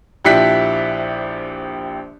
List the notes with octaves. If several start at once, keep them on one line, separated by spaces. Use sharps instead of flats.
A#1 F3 E4 G4 F#6 B6